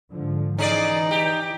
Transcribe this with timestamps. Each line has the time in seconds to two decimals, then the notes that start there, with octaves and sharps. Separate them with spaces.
0.12 G#2 D3 F3
0.58 E3 C#4 D#4 G#4 D5
1.11 G4